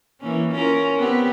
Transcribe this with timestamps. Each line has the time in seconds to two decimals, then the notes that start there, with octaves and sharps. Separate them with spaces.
0.21 E3 A#3 C#4
0.52 C#4 F4 A#4
0.99 B3 C4 G4